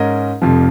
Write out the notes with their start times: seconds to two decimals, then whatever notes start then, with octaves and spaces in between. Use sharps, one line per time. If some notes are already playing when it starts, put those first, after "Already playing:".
Already playing: G#2 G#3 C#4 A#4 D#5
0.42 F1 F2 F3